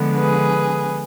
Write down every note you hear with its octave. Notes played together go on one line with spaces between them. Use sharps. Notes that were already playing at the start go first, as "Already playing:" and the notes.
Already playing: D3 F3 G#3 B3
G#4 B4